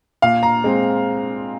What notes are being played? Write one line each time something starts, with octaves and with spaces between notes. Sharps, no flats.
A#2 F5
A#5
G#3 C4